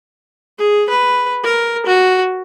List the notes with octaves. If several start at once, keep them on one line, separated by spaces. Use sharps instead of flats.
G#4
B4
A#4
F#4